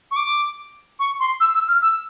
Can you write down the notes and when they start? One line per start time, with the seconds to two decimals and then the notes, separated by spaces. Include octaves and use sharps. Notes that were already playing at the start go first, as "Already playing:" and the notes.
0.11 C#6
0.16 D6
0.99 C#6
1.20 C6
1.40 E6
1.54 E6
1.68 F6
1.82 E6